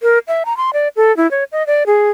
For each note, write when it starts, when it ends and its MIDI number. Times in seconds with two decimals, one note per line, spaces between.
0.02 0.19 70
0.28 0.43 76
0.46 0.56 82
0.57 0.70 84
0.73 0.88 74
0.96 1.15 69
1.17 1.29 64
1.31 1.44 73
1.52 1.65 75
1.67 1.84 74
1.86 2.10 68